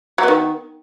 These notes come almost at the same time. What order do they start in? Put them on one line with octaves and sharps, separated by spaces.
F#3 B3 D#3